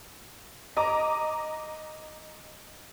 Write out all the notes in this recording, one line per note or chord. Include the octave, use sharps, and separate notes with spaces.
D#5 A#5 D6